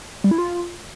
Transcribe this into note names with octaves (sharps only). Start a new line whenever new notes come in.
G3
E4
F4